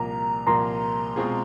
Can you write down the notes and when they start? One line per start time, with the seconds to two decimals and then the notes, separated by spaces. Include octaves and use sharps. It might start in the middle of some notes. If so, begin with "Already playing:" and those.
Already playing: C2 A#2 F3 A#3 A#5
0.47 C2 A#2 F3 A#3 A#5 C6
1.16 B2 G#3 C4 F4 G#4